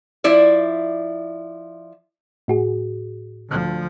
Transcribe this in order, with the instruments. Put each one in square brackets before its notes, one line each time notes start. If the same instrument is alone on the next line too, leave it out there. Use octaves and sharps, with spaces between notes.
[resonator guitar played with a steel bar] F3 E4 D5 E5
[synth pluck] A2 F#4 G#4
[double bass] D2 F3